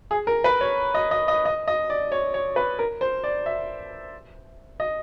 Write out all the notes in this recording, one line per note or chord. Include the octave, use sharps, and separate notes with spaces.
G#4
A#4
B4
C#5
D#5
D#5
D#5
D#5
D#5
D5
C#5
C#5
B4
A#4
C5
D5
E5
D#5